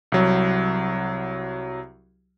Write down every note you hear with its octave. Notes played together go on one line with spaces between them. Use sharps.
C2 F#3